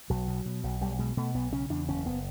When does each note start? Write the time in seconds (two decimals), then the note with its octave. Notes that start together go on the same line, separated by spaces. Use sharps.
0.10 B1 F#3
0.28 B2
0.46 B2
0.64 B1
0.81 B1 G3
0.99 B2 G#3
1.17 B2 A3
1.35 B1 B3
1.52 C#3 C#4
1.70 E2 D4
1.88 F#1 C#4
2.05 F#1 B3